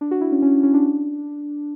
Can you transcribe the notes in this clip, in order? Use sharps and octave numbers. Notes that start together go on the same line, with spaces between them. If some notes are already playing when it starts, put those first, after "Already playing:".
D4
F#4
E4
C#4
C#4
C#4
D4